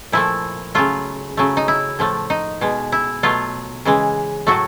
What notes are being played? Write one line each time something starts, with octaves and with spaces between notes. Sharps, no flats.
A#2 F3 A3 E4
C#3 F#3 A3 F4
C#3 F#3 A3
D#4
E4
A2 F3 A3
D#4
B2 G#3
E4
B2 F#3 A3 F4
C#3 E3 G#3
A2 F#3 A3 F#4